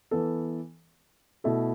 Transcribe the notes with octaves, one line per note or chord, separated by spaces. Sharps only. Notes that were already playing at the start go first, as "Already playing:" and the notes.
E3 B3 A4
B2 A3 E4 A4